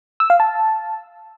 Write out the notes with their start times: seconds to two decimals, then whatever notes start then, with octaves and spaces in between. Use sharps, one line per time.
0.20 E6
0.30 F5
0.40 A5